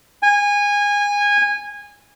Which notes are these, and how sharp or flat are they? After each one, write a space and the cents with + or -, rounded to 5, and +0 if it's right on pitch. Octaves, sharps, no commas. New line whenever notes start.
G#5 -20